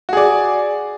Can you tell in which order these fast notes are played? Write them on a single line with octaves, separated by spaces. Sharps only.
F#4 G#4 D5